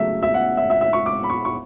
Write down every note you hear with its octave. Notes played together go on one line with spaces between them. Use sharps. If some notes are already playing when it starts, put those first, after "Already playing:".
Already playing: C#3 F#3 A3 C#4 E5
E5
F#5
E5
E5
E5
C#6
D6
B5
C#6
C#6